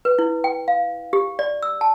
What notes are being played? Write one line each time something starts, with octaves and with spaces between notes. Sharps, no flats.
B4
E4
G5
F5
G4
D5
E6
A5